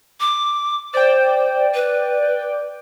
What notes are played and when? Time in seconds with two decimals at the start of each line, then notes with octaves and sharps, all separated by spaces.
0.20 D6
0.94 C5 D5 G5
1.74 B4